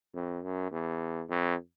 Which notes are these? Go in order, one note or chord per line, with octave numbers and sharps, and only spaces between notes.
F2
F#2
E2
F2